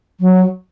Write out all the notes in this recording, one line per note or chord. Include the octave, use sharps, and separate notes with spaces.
F#3